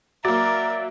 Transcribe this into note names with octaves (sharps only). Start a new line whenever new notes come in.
F#3 A#3 A#4 D5 E5